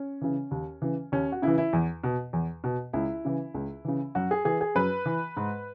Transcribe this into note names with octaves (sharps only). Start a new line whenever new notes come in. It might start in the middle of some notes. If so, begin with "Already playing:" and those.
Already playing: C#4
C#3 E3
D#2
C#3 E3
D#2 C#4
F#4
C#3 E3 E4
E4
E2
B2
E2
B2
C#2 E4
C#3 E3
C#2
C#3 E3
F#2 F#4
G#4
E3 G#4
G#4
F#2 B4
E3
G#2